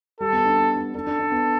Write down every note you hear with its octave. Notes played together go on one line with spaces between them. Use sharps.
G3 A4
B3
D4
B3
D4
D4 A4
D4
D4
B3